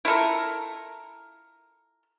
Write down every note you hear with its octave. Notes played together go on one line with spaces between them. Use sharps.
E4 F4 A4 A#4